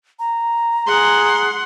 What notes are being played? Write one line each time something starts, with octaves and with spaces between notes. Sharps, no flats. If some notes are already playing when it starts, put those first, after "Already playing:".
A#5
G#4 F#5 C6